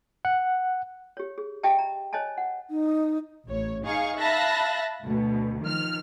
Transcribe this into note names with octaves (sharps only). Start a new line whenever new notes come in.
F#5
G4 C#5
G#4
G4 D#5 E5 G5 A5
A#5
C5 C#5 D#5 G#5 A5
F#5
D#4
A1 C#5
D#4 G#4 F5 C#6
E5 F5 A5 B5 F#6 A#6
D2 B2
D#3 F3 F6